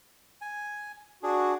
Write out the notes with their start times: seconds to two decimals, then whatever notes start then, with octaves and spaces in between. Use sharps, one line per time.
0.41 G#5
1.23 D4 F#4 G#4